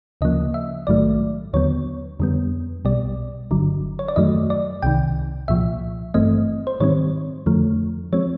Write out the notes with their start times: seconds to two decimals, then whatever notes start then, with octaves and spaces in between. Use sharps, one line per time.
0.21 D2 C#3 F3 A#3 D#5
0.54 E5
0.87 A#1 G#2 D#3 F#3 A3 D5
1.53 D#2 D3 F#3 B3 C#5
2.20 F2 D3 G3 B3
2.85 B1 B2 G3 D5
3.51 G1 G2 D3 F#3
3.99 C#5
4.08 D5
4.16 F#2 D#3 F#3 A3 D#5
4.50 D5
4.82 C2 C3 D#3 G5
5.48 C2 A#2 F3 E5
6.14 G#1 G2 E3 A3 C4 D#5
6.67 C5
6.80 G#2 D#3 G3 C4 C#5
7.46 F2 D3 F3 A3
8.13 F3 G#3 C4 C#5